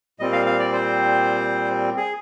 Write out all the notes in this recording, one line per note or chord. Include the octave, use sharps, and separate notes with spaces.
A#2 G3 C4 D#5
F5
F5
D5
C5
G#4